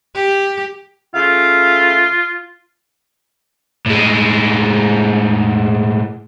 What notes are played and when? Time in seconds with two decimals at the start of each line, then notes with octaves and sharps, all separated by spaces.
0.15 G4
1.15 C#3 A3 F4 F5
3.86 A2 G#3